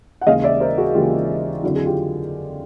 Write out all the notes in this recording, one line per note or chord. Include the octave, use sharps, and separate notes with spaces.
F#5
D#2 C#3 E3 G#3 D#5 F5
D5 E5
A#4 C5
F#4 G#4
D#2 C#3 E3 G#3 F4 G4
F2 D3 F#3 E4 F#4
G#4
F4 G4